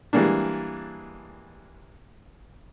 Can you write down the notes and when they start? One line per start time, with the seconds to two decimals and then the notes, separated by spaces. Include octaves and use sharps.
0.13 E3 G3 G#3 A#3 D4